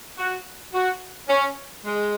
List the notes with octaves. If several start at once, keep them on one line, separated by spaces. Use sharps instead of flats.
F#4
F#4
C#4
G#3